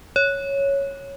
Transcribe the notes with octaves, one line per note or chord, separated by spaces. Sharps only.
C#5